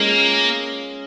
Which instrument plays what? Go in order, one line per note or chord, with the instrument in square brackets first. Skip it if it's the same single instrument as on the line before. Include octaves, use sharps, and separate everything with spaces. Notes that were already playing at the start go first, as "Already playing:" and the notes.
Already playing: [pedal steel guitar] G#3 C#4 F4 G#4 [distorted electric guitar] A#3